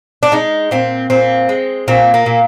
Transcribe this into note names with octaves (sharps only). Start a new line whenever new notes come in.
D4
G#3 D#4
A#2 C4
A#2 C4
G#3
A#2 C4
A#3
A#2